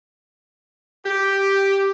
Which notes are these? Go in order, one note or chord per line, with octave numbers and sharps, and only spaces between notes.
G4